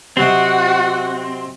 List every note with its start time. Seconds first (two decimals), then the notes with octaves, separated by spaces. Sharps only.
0.17 C3 F#3 C4 F#4 D#5